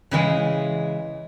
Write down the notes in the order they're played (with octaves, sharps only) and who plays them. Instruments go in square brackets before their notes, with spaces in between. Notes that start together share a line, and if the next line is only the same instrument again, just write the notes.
[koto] C#3 E3 G#3